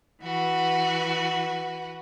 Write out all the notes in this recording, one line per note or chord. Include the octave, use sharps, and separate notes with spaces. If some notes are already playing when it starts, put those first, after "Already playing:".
E3 F#4 B4